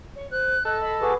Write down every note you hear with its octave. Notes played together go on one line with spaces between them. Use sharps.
C#5
C5 F#6
A4 D#5 F#6
D#5 B5
F#4 G#4 B4 D6